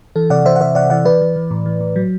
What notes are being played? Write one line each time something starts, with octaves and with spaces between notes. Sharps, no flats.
E3 A4
C3 D5 F#5
E3 C5 E5
F#5
C3 C5 E5
C3 D5 F#5
E3 D5 F#5
E3 B4 D5
E3
E3
A2
E3
A2
F#3